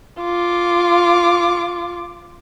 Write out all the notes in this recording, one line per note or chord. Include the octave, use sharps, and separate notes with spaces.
F4 D6